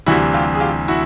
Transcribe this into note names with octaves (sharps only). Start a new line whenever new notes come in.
D2 C3 E3 G3 E4 F#4
F4 G4
G#4
F4 G4
E4 F#4